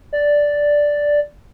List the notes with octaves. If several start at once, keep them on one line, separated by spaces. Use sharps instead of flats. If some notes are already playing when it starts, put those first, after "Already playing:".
D5